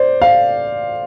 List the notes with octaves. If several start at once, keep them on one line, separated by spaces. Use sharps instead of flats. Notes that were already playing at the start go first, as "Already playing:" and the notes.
Already playing: C5 D5
F5